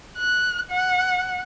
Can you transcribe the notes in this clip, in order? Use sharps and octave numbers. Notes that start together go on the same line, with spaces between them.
F#6
F#5